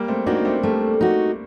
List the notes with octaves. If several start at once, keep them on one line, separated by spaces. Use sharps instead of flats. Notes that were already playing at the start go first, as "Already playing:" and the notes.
Already playing: G3 A#3
A3 C4
A#3 D4 D#4 F#4
A#3
A3 C4
G3 A3 A#3
D#4 F#4